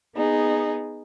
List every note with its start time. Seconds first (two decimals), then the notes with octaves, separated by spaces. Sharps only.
0.16 B3 D#4 G#4